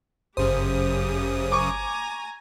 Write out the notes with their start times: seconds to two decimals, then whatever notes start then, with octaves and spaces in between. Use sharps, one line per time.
0.37 G1 F#2 C#3 G4 C5 D#6
1.52 G#5 A#5 C#6 D6